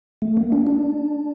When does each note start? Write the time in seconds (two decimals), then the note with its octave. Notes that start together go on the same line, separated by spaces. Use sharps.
0.22 A3
0.37 A#3
0.52 D4
0.67 D4